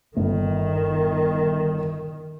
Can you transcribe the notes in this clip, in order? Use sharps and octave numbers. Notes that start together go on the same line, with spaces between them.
G1 D#3